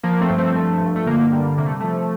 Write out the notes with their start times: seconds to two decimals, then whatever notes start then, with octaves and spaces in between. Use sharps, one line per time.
0.03 F3 A#3
0.21 A3 C4
0.30 G2
0.38 A3 C4
0.55 F3 A3
0.81 G2
0.96 A3
1.07 D3 A#3
1.32 G3 A#3
1.58 C3 A#3
1.66 A3
1.80 F3 A3